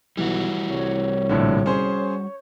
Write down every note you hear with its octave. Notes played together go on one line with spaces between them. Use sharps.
B1 E3 G3 F#4
C2 C#5
A#1 A2 D3
C#4 G#4 C5